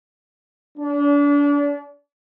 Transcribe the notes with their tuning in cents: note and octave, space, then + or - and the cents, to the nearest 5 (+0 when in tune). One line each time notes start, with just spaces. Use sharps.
D4 -35